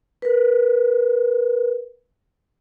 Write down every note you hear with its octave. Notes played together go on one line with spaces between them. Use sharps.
A#4 B4